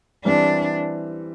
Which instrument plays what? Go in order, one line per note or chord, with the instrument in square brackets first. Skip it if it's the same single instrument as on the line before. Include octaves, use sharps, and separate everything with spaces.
[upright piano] E3 G3 C4 [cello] D4